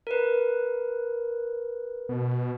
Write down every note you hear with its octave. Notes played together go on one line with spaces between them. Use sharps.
A#4 B4
B2